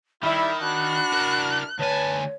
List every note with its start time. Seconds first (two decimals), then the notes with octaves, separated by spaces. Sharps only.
0.23 D#3 G3 E4 E5 B5
0.63 D4 F#4 B5 F#6
1.13 E4 A#4
1.80 D2 B4 C#5 G#5 A5